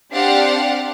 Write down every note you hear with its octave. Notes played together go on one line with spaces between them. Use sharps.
C4 D4 G4 D5 F5 F#5